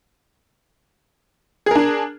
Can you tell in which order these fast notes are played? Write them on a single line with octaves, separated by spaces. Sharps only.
G#4 A#4 D4